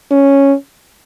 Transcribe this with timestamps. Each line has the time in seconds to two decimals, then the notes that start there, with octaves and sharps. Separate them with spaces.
0.12 C#4